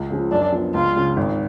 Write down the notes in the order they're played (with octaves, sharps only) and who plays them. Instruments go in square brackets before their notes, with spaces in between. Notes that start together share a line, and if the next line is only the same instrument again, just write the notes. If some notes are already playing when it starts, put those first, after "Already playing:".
Already playing: [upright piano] C#2
C#3 F3
[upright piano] F#2 [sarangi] D4
[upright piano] F3 B3 D4
[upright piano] C#2 [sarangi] F4
[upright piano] C#3 G#3
G#1